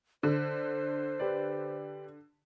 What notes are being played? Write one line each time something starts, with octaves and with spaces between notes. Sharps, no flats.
D3 C5
G4 B4 D5